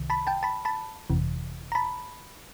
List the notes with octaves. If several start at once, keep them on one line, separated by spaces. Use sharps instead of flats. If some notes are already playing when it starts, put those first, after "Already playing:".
Already playing: C2 C3 D#3
A5 B5
G5 A5
A5 B5
A5 B5
G1 F2 C3 E3
A#5
A5 B5